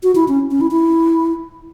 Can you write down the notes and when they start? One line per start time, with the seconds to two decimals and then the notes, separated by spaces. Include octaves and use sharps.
0.03 F#4
0.15 E4
0.28 C#4
0.51 C#4
0.61 E4
0.71 E4